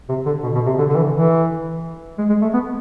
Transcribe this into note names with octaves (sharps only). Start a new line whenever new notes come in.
C3
D3
B2
B2
C3
D3
D3
E3
E3
G#3
G#3
A3
B3